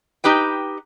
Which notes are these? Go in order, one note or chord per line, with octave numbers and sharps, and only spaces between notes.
D#4 G4 B4 G5